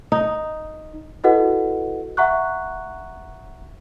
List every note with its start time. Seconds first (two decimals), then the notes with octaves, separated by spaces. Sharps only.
0.12 D#4
1.24 E4 F#4 A4 B4 D#5 F#5
2.17 E5 F#5 A#5 C#6 F#6